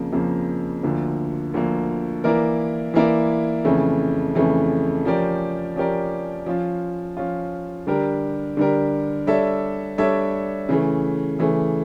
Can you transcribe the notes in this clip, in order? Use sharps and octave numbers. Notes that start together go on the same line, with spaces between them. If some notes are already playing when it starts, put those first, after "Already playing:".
Already playing: F2 C#3 F3 A#3
F2 C#3 F3 A#3
D2 D3 F3 A#3
D2 D3 F3 A#3
E3 A#3 E4 A#4 D5
E3 A#3 E4 A#4 D5
F2 C#3 E3 A3
F2 C#3 E3 A3
F3 C#4 G4 A#4 D5
F3 C#4 G4 A#4 D5
F3 C#4 F4
F3 C#4 F4
D3 G3 D4 G4 A#4
D3 G3 D4 G4 A#4
G3 D4 A4 C#5 E5
G3 D4 A4 C#5 E5
C#3 E3 A3
C#3 E3 A3